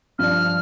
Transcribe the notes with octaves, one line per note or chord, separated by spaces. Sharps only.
G2 F3 D4 F6